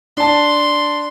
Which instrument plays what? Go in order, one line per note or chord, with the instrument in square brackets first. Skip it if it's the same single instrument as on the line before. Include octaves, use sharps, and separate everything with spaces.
[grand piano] D4 A5 [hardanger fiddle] C6